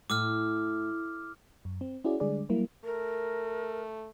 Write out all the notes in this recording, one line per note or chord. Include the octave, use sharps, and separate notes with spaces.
A2 D6 E6 F6
F#2
C4
C#4 E4 F#4 G#4 D5
D3 G3 G#3 D4 G#4 D5
F#3 G3 A#3 E4
A3 A#4